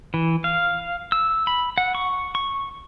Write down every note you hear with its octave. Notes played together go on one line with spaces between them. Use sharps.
E3
F5
E6
B5
F#5
C#6
C#6